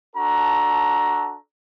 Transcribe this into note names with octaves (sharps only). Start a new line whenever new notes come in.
D4 F#4 A4 A#5